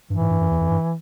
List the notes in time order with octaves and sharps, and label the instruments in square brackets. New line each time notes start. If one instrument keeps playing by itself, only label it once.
[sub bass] G2 [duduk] E3
[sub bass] G#2
G2
F#2
E2
F2
G2